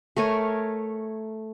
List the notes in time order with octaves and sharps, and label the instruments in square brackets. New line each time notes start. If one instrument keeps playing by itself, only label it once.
[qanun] A3 A#4 C#5 G#5